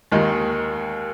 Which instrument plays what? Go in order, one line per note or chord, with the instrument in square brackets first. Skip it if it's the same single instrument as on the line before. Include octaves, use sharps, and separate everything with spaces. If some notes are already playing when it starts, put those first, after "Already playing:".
[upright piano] D#2 D#3 G#3